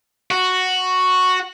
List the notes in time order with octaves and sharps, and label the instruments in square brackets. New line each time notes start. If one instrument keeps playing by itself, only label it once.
[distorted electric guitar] F#4